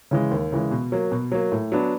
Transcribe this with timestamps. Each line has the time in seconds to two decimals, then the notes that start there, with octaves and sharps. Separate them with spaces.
0.11 C#3 E3 G#3
0.31 D#2
0.52 C#3 E3 G#3
0.71 B2
0.92 F#3 A#3
1.12 B2
1.32 F#3 A#3
1.52 A2
1.72 F#3 B3 D4